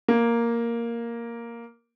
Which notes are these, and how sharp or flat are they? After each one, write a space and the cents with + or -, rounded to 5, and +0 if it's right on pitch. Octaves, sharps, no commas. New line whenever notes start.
A#3 +0